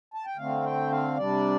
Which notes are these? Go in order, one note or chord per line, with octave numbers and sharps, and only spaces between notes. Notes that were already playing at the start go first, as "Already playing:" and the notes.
A5
G5
D3 A3 C4 F5
G5
F5
C3 G3 D4 D5